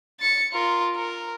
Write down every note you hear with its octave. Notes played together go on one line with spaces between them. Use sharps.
A6 C#7
F4 A#4
A#4